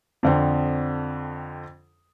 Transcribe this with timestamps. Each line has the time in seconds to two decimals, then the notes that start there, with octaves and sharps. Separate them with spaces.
0.23 F2 D3 C4